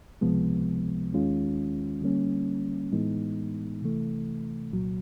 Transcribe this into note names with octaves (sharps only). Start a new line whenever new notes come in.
C#2 C3 F3 G#3 B3
D#2 D#3 G#3 C#4 F4
D3 G3 A#3 C#4
A2 E3 G#3 B3 D#4
C3 E3 A3
C2 A#2 F#3